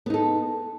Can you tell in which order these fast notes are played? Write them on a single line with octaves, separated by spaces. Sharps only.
B3 D#4 A4